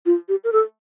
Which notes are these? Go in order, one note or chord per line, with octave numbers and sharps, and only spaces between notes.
F4
G4
A#4
A4